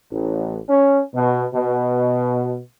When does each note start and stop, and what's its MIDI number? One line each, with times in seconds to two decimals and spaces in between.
0.12 0.58 33
0.69 1.00 61
1.15 1.46 47
1.55 2.61 47